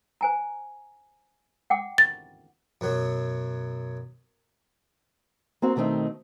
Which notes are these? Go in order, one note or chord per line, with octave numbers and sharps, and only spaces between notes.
C5 G#5 A#5
F#5 G5 D6
A6
F#2 B2 F#3
A#3 C4 F#4
B2 D#3 A3 C4 D#4